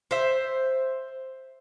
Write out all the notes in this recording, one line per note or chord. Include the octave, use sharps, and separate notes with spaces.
C5 E5